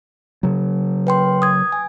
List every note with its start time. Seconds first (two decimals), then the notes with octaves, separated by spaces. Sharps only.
0.43 C#3 F#3
1.07 B4 G5 C6
1.42 D#6 G#6
1.72 G#5